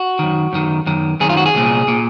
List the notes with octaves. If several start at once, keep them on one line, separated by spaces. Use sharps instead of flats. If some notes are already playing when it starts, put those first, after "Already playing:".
Already playing: F#4
F#2 D#3
F#2 D#3
F#2 D#3
F#2 D#3 G#4
F4
F#4
G#4
C2 A#2
A#2